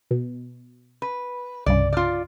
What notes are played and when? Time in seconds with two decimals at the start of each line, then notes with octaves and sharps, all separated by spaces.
0.11 B2
1.02 B4
1.66 C2 G2 C#3 D5
1.93 F4 D5